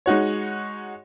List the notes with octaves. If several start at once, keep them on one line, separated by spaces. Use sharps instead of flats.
G#3 D#4 F#4 C#5